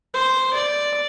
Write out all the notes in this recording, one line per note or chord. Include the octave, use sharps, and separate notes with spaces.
C5
D5